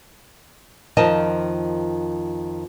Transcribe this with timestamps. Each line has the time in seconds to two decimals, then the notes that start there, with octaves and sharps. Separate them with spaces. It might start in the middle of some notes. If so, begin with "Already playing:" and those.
0.97 F2 D#3 F3 A#4 D#5 A5